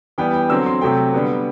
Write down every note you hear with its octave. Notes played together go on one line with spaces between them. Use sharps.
E3 G3 B3 G5
G5
D3 F#3 C4 E6
C6
C3 F#3 A3 C4 G5
D3 G3 B3